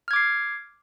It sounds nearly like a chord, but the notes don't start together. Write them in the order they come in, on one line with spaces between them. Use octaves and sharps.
F6 G#6 D6 C7